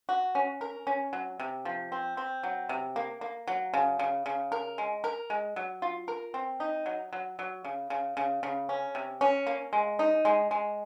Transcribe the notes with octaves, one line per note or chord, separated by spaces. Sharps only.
F#4
C#4
A#4
C#4
F#3
C3
F3
C4
C4
F#3
C3
A#3
A#3
F#3
C#3
C#3
C#3
A#4
G#3
A#4
G#3
F#3
F4
A#4
C4
D#4
F#3
F#3
F#3
C#3
C#3
C#3
C#3
C#4
C3
C#4
A#3
G#3
D#4
G#3
G#3